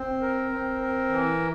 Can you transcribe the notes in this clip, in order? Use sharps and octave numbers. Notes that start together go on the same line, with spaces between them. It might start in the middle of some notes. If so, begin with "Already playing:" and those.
Already playing: C4
A#4
C4
A#4
E3